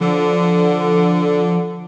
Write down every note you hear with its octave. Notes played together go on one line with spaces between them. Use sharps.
D3 F3